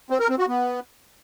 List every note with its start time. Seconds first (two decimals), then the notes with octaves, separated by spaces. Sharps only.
0.10 C4
0.20 A#4
0.29 C4
0.39 F#4
0.48 B3